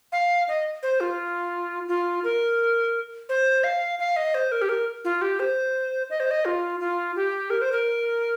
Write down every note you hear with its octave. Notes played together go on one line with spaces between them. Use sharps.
F5
D#5
C5
F4
F4
A#4
C5
F5
F5
D#5
C5
A#4
G4
A#4
F4
G4
C5
D#5
C5
D#5
F4
F4
G4
A#4
C5
A#4